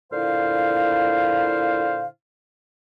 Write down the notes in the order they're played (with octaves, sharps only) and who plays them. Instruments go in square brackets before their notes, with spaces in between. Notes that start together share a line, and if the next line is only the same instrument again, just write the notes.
[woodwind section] A#2 D3 E4 C5 F5